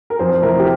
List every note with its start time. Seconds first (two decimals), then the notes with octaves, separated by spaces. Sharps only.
0.10 A#4
0.19 F2 C5
0.42 C3 E3 A#4
0.59 G4